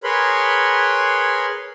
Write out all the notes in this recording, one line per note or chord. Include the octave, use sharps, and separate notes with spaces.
G#4 A#4 B4 C#5 B5 C6